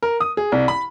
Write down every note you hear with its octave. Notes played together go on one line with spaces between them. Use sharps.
A#4
D#6
G#4
C2
B5